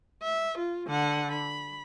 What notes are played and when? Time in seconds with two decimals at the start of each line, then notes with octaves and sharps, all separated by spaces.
0.23 E5
0.58 F4
0.87 D3 F#5
1.32 B5